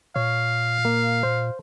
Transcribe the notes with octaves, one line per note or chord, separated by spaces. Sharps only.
A#2 C#5 F5
A#3
C5